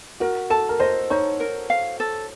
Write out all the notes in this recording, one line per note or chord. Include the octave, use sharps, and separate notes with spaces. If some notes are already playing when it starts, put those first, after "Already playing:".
F#4 A#4
A4 A5
A#4
C5 D#5
D#4 C#5
A#4
F5
A4